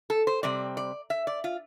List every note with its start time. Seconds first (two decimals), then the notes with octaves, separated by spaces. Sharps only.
0.10 A4
0.27 C5
0.43 C3 G3 C4 D5
0.77 D5
1.10 E5
1.27 D5
1.44 F4